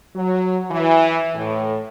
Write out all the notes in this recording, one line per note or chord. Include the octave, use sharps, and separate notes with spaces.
F#3
E3
A2